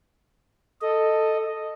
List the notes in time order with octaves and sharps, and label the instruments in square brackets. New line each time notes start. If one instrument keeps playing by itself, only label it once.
[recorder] A4 [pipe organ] D#5